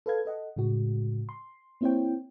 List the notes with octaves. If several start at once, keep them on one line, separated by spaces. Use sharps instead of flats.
A4 B4 F5 G#6
A4 D#5 F#5
A2 C#3 G#3 F#4
C6
A#3 C4 E4 C5 C#5 G5